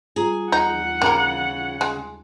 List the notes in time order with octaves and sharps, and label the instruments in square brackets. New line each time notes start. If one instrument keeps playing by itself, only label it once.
[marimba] G3 F4 A#5 [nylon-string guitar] G#4
[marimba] D#2 [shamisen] D#4 [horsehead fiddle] F#5
[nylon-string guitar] C#3 F4 [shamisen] A#3 A#4 [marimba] G5
[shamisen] G#3